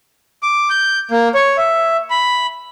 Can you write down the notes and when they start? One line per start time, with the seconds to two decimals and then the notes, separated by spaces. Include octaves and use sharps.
0.43 D6
0.70 G6
1.11 A#3
1.35 C#5
1.57 E5
2.10 B5